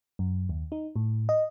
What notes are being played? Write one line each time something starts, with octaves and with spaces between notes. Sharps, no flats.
F#2
D#2
D#4
A2
D#5